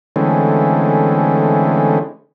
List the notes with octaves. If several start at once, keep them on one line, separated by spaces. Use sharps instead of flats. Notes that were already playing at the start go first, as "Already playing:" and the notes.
D3 E3 G#3 A3 C4 C#4